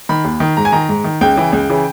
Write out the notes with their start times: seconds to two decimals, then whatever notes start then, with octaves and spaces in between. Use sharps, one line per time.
0.09 D#3 B5
0.24 D#2
0.40 D#3
0.57 G#2 A#5
0.65 G#5
0.72 D#3 A#5
0.89 G#2
1.04 D#3
1.21 C#2 G5
1.36 C#3 E3
1.53 C#2
1.70 C#3 E3